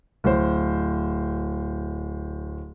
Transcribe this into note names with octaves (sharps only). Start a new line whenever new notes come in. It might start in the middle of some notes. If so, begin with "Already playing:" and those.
D1 C5